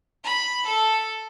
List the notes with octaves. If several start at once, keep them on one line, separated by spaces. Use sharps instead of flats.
B5
A4